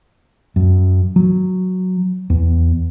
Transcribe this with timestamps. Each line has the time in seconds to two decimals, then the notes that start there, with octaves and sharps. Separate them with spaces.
0.56 F#2
1.16 F#3
2.30 E2